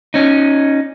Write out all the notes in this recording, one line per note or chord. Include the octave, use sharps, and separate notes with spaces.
C#4 D#4